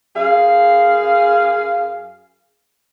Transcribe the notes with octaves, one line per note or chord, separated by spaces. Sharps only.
F#2 G#4 F5